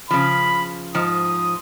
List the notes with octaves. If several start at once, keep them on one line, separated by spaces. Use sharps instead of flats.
C#3 F3 B5
G#2 F3 D#6